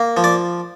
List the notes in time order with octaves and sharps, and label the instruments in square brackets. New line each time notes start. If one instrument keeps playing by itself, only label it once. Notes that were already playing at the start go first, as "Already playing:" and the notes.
Already playing: [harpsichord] A#3
F3
D5